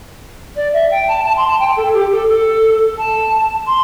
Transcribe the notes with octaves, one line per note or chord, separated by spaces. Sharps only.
D5
E5
G5
A5
A5
C6
A5
G5
A4
G4
A4
A4
A5
C6